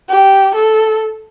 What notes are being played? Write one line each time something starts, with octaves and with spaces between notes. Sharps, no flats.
G4
A4